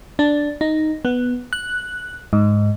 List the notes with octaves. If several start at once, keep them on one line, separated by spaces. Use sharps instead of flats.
D4
D#4
B3
F#6
G#2